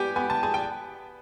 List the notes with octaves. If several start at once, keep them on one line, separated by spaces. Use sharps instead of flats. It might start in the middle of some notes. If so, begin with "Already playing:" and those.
Already playing: B3 G4 G5 G#5
B3 G#5
A5
G#4 G#5
G5